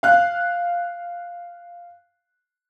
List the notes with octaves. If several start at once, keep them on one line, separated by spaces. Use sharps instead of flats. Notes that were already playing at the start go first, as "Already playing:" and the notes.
F5 F#6